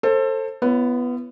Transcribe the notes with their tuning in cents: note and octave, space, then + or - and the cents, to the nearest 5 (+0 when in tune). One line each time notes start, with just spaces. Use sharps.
A4 +20 C5 +25
B3 +0 E4 +45 C#5 +0